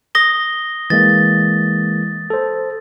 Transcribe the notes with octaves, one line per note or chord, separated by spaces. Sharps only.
D#6 A#6 G7
E3 G#3 A#3 A6
A4 C5